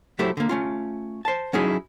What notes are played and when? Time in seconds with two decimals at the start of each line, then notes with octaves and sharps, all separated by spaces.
0.19 F#3 A3 E4 G4 A4 C5
0.37 D3 A#3
0.49 A3 C#4 F4
1.25 C5 A5
1.53 F#3 C#4 D#4 E4 G#4